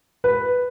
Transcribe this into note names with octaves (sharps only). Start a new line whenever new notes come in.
B4